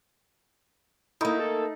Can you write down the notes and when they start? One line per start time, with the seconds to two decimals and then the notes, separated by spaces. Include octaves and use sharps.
1.21 D#3 A3 A#3 D#4 E4
1.39 A4